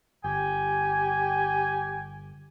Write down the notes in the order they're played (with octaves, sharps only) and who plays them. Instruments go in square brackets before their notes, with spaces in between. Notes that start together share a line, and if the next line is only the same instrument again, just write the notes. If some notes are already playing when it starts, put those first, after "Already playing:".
[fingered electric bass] G1 [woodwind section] G4 G5 G#5